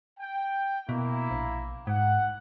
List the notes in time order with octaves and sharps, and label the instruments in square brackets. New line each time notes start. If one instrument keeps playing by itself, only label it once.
[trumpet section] G5
[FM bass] B2 [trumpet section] A#3 E4
[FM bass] A#1
[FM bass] G#2 [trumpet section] F#5